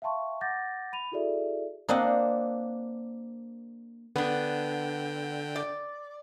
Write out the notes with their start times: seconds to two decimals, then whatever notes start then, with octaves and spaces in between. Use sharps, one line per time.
0.02 E5 F5 G5 A5 C6 C#6
0.41 F#5 D6 G6 A6 A#6
0.93 B5 D#7 F7
1.12 E4 F#4 G#4 A4 D5 E5
1.89 A#3 C4 D4 C5 D#5 F#5
4.16 D3 B3 D4 G5
5.56 D5